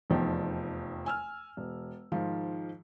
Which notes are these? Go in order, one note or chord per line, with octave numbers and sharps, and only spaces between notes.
F1 E2 F3 D#4 G5
G#5 E6 F6
E1
G#2 D#3 F3 F5